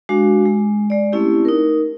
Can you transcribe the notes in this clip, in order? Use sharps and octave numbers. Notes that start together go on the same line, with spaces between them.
G#3 D4 F#4 F5
G#3
G#3 D5
A3 C4 C#4 E4 G4
D#4 A#4